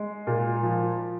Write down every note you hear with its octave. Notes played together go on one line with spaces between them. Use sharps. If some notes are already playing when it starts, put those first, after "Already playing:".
Already playing: G#3
A#2
F3